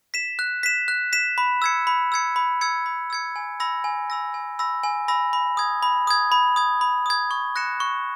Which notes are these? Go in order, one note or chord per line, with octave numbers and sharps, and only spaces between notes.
B6 E7
F#6
B6 E7
F#6
B6 E7
B5
E6 G#6 C#7
B5
E6 G#6 C#7
B5
E6 G#6 C#7
B5
E6 G#6 C#7
G#5
B5 E6 A#6
G#5
B5 E6 A#6
G#5
B5 E6 A#6
G#5
B5 E6 A#6
B5
D#6 G#6
B5
D#6 G#6
B5
D#6 G#6
B5
D#6 G#6
C#6
F#6 A#6 C#7 E7
C#6